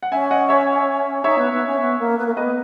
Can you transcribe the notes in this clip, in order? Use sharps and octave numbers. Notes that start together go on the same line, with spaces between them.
F#5
C#4 E5 G#5
D#5 F#5
C#5 E5
D#4 C#5 E5
B3
B3
C#4
B3
A#3
B3
A#3
B3 B4 D#5